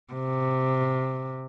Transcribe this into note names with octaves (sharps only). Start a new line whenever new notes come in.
C3